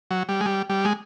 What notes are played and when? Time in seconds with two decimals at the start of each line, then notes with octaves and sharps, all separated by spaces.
0.11 F#3
0.29 G3
0.41 G#3
0.46 G3
0.69 G3
0.85 G#3